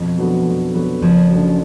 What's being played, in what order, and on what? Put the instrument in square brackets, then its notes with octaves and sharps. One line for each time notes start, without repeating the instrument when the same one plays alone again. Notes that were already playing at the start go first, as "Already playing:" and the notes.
Already playing: [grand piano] F2 [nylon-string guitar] B2
[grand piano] D3 F#3 B3 F#4
F2
D3 F#3 B3 F#4
[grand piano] F#1 [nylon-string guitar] C#3 F3
[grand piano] F#2 D3 F#3